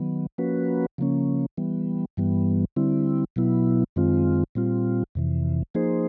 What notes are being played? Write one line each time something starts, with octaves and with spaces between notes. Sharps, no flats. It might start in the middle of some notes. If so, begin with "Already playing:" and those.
Already playing: D#3 F#3 B3
F3 A#3 C#4 F#4 B4
C#3 F3 A#3 C#4
E3 G3 B3
G2 E3 G3 B3
D3 G3 C4 E4
B2 F#3 B3 E4
F#2 D#3 G#3 C4 F4
A#2 G3 C4 F4
F2 C3 E3
F3 A#3 D#4 G#4 C5